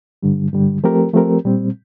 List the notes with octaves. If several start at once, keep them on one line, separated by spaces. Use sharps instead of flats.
G2 D3 G3
G2 D3 G3
F3 A3 C4 G4 A#4
F3 A3 C4 G4 A#4
A#2 G3 C4